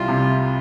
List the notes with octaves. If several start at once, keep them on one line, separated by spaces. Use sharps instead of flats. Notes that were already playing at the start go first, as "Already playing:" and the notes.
Already playing: C2 G3 F4
C3